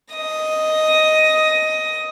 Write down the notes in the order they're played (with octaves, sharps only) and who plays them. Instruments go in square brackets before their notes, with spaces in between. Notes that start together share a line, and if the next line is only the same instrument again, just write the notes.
[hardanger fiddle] D#5 D#6